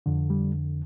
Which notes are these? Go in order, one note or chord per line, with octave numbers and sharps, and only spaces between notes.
F2 D3
G3